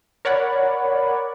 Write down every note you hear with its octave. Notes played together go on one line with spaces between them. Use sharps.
A#4 C#5 D5 F#5 B5